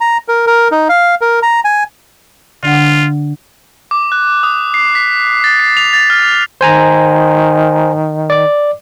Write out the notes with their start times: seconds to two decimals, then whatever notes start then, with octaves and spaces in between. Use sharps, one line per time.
0.01 A#5
0.28 A#4
0.47 A#4
0.72 D#4
0.89 F5
1.21 A#4
1.42 A#5
1.65 G#5
2.63 D3 D4 F4 F#5
3.91 D6
4.12 F#6
4.43 D#6
4.74 C7
4.95 B6
5.44 A6
5.60 C7
5.77 F7
5.93 A6
6.10 F6
6.61 D#3 C5 G#5 A#5
8.30 D5 D6